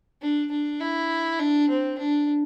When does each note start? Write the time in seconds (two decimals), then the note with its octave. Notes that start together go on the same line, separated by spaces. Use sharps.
0.22 D4
0.51 D4
0.81 E4
1.40 D4
1.69 C4
1.98 D4